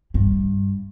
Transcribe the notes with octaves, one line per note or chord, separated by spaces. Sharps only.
G2